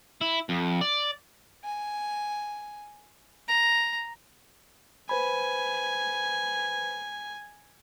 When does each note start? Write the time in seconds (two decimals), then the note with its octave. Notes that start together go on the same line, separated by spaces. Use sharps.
0.21 E4
0.49 F2
0.81 D5
1.64 G#5
3.48 A#5
5.09 B4 C5 G#5 B5